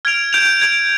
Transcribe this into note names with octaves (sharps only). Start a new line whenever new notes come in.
F6 G#6 D7 F7
G6 D7 F7
G#6 D7 F7